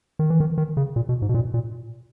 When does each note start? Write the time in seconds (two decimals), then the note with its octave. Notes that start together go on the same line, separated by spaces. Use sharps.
0.19 D#3
0.30 E3
0.40 D#3
0.58 D#3
0.77 C#3
0.96 A#2
1.09 B2
1.22 G#2
1.29 B2
1.34 A#2
1.54 A#2